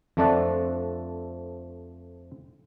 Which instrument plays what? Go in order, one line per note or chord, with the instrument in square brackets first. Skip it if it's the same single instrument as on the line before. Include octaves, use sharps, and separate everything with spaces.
[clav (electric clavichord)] F2 F3 A3 D4 D5 F#5